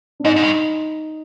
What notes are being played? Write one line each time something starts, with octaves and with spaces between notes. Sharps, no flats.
D4
G#2 D#4
G#2
G2